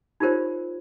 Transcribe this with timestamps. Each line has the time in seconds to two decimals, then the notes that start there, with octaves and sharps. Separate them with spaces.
0.20 D#4 F4 G4 A#4 C5 C#5